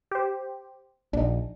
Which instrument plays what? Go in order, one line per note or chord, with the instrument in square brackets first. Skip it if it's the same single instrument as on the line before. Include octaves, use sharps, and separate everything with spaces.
[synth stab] G4 C5
[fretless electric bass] A#1 [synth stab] D4 D#4